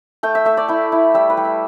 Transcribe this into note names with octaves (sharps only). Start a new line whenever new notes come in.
A3 G5
E5
A3 E5
D5
E4 G5
E4
G3 E5
B4
G3
E5